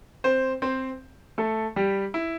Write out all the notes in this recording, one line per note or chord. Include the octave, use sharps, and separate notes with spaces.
C4 C5
C4 C5
A3 A4
G3 G4
E4